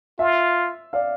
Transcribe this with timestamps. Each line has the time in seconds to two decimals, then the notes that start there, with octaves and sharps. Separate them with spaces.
0.19 F4 E5
0.93 D5 F5